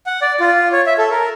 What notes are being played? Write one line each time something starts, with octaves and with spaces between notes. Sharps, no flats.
F#5
D5
F4
C#5
E5
A4
A#4